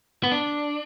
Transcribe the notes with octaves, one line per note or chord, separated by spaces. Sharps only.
B3
D4